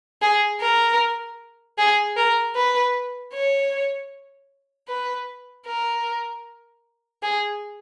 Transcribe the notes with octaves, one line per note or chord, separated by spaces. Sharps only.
G#4
A#4
G#4
A#4
B4
C#5
B4
A#4
G#4